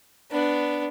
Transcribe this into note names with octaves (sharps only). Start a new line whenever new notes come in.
B3 D4